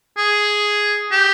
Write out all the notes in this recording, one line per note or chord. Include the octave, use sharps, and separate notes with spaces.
G#4
G4